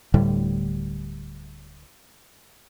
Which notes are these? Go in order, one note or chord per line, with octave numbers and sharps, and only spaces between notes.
D1 A2 D3 G3